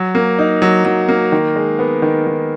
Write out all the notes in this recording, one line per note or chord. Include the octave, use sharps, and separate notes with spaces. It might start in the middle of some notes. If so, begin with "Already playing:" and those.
Already playing: F#3
A#3
D#4
F#3
F#3
A#3
D#3
G#3
B3
D#3
D#3